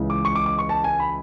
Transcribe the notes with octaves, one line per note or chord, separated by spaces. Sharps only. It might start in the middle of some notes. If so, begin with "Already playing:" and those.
Already playing: C#2 C#3 E3
D6
C#6
D6
D6
C#6
A5
G#5
B5